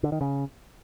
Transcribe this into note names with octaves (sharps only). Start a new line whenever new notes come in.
D3
D#3
C#3